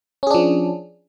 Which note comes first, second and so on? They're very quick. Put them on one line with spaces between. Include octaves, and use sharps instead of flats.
C#4 G#4 D4 F3